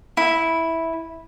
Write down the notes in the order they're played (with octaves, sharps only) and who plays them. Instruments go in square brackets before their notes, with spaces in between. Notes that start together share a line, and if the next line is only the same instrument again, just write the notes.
[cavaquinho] E4